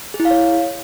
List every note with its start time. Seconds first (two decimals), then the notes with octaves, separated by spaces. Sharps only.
0.14 G#4
0.20 E4
0.25 F5
0.31 C#5